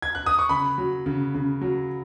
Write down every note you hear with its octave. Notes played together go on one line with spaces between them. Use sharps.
G#6
F#6
D#6
C#6
C#3 B5
F#3
C#3
C#3
F#3